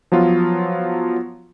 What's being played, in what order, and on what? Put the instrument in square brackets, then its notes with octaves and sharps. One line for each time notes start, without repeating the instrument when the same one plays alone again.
[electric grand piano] F3 F#3 B3 F4